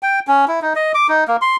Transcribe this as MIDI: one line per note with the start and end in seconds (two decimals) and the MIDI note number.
0.03 0.20 79
0.28 0.45 61
0.48 0.60 64
0.62 0.73 63
0.75 0.92 75
0.94 1.07 86
1.09 1.24 63
1.28 1.36 58
1.42 1.56 84